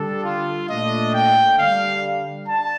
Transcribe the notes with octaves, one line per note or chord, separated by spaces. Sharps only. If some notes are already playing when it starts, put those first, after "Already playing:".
Already playing: D3 G3 D4 A4
F4
A#2 A3 D4 D#5
G5
D3 G3 D4 F5
D4 A5